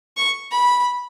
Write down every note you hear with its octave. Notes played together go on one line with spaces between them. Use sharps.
C#6
B5